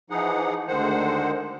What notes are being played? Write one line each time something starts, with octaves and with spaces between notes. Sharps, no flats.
E3 F3 D#4 G#4 F#5
D2 D3 D#3 G#3 C5 F#5